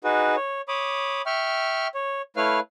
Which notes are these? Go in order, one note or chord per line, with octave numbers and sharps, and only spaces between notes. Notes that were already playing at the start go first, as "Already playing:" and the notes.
D#4 F#4 G#4 B4
C#5
C#5 B5 D6 D#6
E5 G5 C#6 F6
C#5
A3 E4 B4 C#5 F5 F6